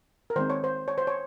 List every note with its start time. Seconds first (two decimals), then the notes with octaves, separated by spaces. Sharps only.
0.30 A#4
0.36 D#3 G#3 C4 C5
0.50 C#5
0.64 C5
0.88 C#5
0.98 C5
1.07 C#5